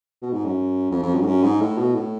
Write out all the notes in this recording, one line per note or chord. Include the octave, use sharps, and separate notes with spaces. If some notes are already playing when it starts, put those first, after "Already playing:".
B2
G#2
F#2
F2
F2
F#2
G#2
F#2
G#2
A2
B2
A2